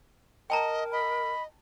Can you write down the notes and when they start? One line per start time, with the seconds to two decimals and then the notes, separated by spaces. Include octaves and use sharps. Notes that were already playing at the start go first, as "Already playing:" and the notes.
0.50 A#4 D#5 G5 A5 A#5
0.92 D#5 B5